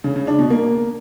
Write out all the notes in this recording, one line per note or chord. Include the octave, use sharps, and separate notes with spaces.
C#3
C#3
D4
B2
A#3